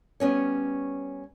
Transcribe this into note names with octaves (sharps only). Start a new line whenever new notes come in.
G3 B3 C#4 C#5